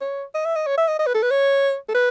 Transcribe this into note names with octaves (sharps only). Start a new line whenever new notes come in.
C#5
D#5
E5
D#5
C#5
E5
D#5
D#5
B4
A4
B4
C#5
A4
B4